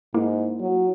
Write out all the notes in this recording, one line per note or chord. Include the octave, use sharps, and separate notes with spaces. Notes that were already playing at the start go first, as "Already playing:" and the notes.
G#2 A#3 E4
F#3